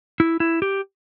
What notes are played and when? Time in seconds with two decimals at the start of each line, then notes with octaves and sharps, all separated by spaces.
0.20 E4
0.40 E4
0.62 G4